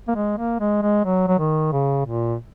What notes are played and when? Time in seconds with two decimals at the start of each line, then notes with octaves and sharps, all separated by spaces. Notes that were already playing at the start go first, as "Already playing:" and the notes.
0.08 A#3
0.16 G#3
0.38 A#3
0.60 G#3
0.82 G#3
1.05 F#3
1.28 F#3
1.39 D#3
1.72 C#3
2.05 A#2